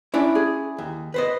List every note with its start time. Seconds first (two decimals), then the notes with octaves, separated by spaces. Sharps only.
0.14 C#4 D4 E4 D5
0.35 G#4
0.78 D#2
1.14 B4 C5 D#5